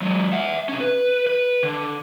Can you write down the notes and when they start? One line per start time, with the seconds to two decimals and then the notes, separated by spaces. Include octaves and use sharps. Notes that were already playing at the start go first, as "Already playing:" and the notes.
0.01 F#3 G#3
0.33 E5 F#5
0.69 C3 C#4
0.81 B4
1.27 B4
1.63 D3